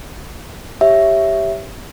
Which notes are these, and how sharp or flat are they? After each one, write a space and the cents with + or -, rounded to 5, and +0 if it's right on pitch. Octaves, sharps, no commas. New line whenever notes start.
G4 +0 C#5 +0 E5 +0